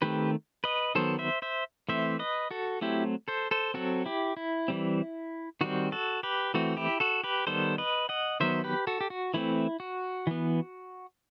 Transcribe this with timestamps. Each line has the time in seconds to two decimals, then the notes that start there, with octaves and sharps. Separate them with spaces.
0.02 D#3 A3 C4 G4 B4
0.64 B4 D#5
0.95 D#3 F#3 B3 A4 C5
1.19 C5 E5
1.42 C5 E5
1.89 E3 A3 C4 C5 E5
2.19 B4 D#5
2.51 F#4 A4
2.81 F#3 A3 C4 E4 G4
3.28 A4 C5
3.51 A4 C5
3.74 F#3 C4 F#4 A4
4.05 E4 G4
4.37 E4
4.68 E3 G3 C4
5.61 D#3 G3 C4 F#4
5.92 F#4 A4
6.23 G4 B4
6.54 E3 A3 C4 F#4
6.77 E4 G4
7.00 F#4 A4
7.24 G4 B4
7.47 D#3 G3 B3 A4 C5
7.78 B4 D#5
8.09 D#5 F#5
8.40 D#3 F#3 B3 C5 E5
8.64 G4 B4
8.87 F#4 A4
9.01 G4
9.10 F#4
9.34 E3 A3 C4 E4
9.80 F#4
10.27 E3 B3